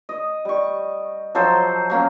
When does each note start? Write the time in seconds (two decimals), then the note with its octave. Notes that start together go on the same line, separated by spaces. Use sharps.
0.09 D#5
0.45 G3 C#6
1.35 F3 F#3 A4 C5
1.90 F#3 A#3 C#4